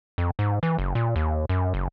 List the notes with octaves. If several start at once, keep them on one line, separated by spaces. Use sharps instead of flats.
F2
G#2
E3
F#1
A#2
D#2
F#2
F#1